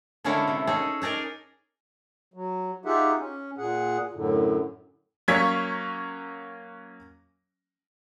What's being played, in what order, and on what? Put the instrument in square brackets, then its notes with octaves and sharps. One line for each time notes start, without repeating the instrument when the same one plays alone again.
[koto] D3 G#3 A#3 C#4 E4 A4
C3
C#4 D#4 G#4 A4
D#4 G#4 A#4 D5
[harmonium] F#3
D#4 F4 G4 G#4 E5 F#5
C#4
A#2 G#4 F#5
F#2 A2 D3
[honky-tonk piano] F#3 A#3 C#4 C#6 G#6 B6